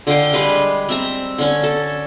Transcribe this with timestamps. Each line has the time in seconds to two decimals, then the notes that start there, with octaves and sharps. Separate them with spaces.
0.07 D3 D#5 F5 G5
0.33 G3 G#3 B4 F5
0.89 C4 E5 A#5
1.38 D3 C#4
1.63 A4 A5